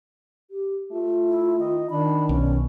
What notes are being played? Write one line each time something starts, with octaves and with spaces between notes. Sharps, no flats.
G4
A3 F4
E4
D#3 D#5
D#3 D4 B5
B1 C#4